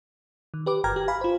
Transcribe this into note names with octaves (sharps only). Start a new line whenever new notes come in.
D#3
G4 B4 D6
G1 G5 A#5 F6 G#6
G4
F5 G#5 B5
F4 C5